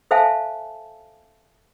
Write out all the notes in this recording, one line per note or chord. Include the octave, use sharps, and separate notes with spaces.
A4 C5 E5 F5 G#5 A5